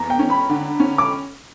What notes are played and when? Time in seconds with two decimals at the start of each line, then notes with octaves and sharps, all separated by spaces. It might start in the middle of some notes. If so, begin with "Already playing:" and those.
Already playing: E2 A#5
0.10 G5
0.19 C#4
0.30 B5
0.49 D3
0.80 C#4
0.98 D6